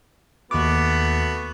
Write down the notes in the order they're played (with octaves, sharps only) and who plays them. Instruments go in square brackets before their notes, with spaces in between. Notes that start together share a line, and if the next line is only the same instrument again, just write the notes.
[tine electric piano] D#2 D6 [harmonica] A3 B3 F#4